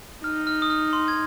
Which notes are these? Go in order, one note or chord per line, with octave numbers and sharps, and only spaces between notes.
D#4 F6
F6
D#6
F6
C6
G#6